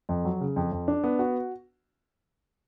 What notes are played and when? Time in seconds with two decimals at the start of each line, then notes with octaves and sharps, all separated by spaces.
0.09 F2
0.25 F#3
0.41 C#3
0.56 F2
0.72 F2
0.88 D4
1.04 B3
1.19 F#4